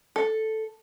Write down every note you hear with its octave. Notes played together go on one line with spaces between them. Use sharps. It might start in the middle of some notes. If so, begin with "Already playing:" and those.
A4